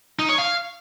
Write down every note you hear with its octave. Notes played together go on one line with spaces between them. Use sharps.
D#4
C#5
F5